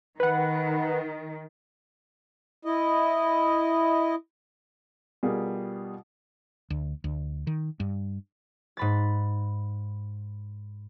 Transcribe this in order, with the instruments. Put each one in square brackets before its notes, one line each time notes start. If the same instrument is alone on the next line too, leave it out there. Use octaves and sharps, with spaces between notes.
[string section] D#3 [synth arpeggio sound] B4 F#5
[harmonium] E4 D#5
[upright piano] B2 G3 F4 G#4 A#4
[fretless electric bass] D2
D2
D#3
G2
[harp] G#2 B5 A6